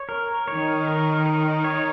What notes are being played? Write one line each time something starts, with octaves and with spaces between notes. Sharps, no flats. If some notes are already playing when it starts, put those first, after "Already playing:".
Already playing: C#5
A#4
D#3 C#5
A#4
A#4
C#5